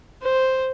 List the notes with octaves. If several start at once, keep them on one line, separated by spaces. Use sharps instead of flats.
C5